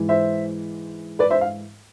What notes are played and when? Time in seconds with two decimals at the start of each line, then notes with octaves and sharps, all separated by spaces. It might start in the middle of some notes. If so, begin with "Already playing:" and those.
Already playing: G#2 E3
0.09 C5 E5
1.19 B4 D5
1.30 C5 E5
1.41 F5